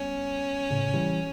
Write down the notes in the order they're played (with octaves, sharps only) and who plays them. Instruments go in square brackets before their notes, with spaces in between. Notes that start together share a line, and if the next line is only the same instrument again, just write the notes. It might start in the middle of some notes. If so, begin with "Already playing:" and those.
Already playing: [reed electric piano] G3 B3 [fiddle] C#4
[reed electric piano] A2 C#3
E3 G3